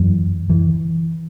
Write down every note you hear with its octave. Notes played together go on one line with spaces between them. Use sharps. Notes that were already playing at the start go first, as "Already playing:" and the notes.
Already playing: F#2 E3
E3